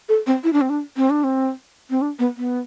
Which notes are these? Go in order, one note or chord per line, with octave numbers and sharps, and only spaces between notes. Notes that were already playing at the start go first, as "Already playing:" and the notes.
A4
C4
E4
D4
C4
D4
C4
D4
C4
C4
D4
B3
B3